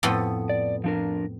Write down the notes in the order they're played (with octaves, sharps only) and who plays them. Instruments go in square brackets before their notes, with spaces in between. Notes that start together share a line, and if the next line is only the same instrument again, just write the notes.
[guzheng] F2 A2 B3
[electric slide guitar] D5
F3 D4 A#4